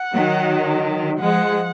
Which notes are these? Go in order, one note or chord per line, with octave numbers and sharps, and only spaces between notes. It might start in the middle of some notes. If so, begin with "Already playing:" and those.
Already playing: F#5
D#3 F#3
F3 G#3 F#5